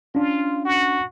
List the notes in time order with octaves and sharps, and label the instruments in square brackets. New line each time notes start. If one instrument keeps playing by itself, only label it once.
[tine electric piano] C#4 D4 [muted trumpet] F4
[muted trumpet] F#4